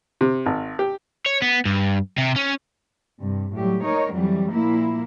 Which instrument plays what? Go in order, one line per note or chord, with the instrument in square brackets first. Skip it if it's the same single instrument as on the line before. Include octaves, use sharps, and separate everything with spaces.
[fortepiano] C3
G#1
G4
[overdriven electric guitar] C#5
B3
G2
C3
C#4
[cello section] G2 C3
A2 F#3 G3 G4
A#3 D#4 A#4 C#5
F2 E3 F#3 G3
A#2 F3 A#3 E4